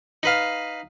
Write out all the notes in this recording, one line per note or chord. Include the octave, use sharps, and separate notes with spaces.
D#4 B4 F5